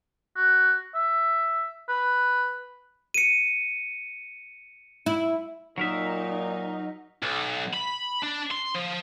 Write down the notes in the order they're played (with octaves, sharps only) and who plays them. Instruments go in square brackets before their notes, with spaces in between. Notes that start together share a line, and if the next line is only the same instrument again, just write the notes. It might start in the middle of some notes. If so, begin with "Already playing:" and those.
[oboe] F#4
E5
B4
[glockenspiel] C#7 D#7
[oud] E4
[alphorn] A#2 [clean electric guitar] F#3 A#4 E5 [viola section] D#4
[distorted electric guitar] B1
B5
D4
C6
F3